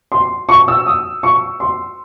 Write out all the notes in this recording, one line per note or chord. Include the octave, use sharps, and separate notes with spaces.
C6
C#6
E6
D#6
C#6
C6